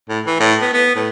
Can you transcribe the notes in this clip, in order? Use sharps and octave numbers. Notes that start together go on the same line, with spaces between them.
A2
E3
A2
B3
B3
A2